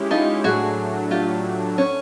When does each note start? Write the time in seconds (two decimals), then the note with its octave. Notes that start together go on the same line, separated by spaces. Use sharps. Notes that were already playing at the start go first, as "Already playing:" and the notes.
Already playing: G#3 C#4 E4 G4
0.11 D#4 F4
0.44 A2 F#3 A3 D4 F#4 G#4
1.11 F4 G4
1.78 C#4